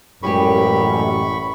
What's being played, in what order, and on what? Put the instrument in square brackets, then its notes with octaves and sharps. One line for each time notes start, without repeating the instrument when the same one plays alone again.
[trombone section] A1 F#2 [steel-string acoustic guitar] G3 G#3 G4 [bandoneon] B5 C#6